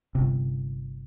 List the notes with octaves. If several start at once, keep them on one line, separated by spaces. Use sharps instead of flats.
G1 C3